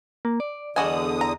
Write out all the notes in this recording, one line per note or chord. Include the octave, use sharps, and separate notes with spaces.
A#3
D5
E2 D3 G3 F#4 D#5 G#5 D#6
A#5